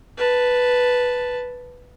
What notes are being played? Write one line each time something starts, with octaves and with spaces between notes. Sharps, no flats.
B4 A5